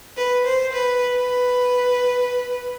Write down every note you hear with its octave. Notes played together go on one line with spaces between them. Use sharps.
B4
C5
B4
B4